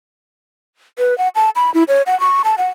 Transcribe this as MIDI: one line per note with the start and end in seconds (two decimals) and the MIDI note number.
0.99 1.17 71
1.18 1.28 78
1.35 1.50 81
1.56 1.72 83
1.74 1.83 64
1.88 2.02 73
2.07 2.18 78
2.20 2.42 85
2.44 2.55 81
2.58 2.67 78